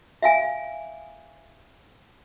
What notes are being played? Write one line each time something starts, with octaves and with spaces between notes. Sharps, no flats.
E5 F5 G#5